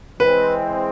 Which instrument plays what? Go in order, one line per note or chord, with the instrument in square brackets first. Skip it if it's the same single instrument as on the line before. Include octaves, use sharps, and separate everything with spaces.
[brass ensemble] E3 G#3 C4 [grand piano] B4